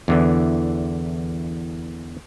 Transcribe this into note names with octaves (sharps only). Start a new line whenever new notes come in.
E2 D3 E3